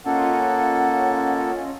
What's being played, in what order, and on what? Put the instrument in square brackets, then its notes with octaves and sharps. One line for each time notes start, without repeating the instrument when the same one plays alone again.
[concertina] A#3 A4 [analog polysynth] C#4 F4 D#5 [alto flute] F#5